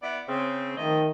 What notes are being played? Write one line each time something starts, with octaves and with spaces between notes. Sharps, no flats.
B3 E4 D5
C#3 C4
D#3 F3 A3 D#5